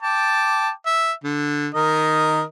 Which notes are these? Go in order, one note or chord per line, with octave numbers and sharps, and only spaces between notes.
G5 A5 D6
E5
D3
D#3 A#4 D#5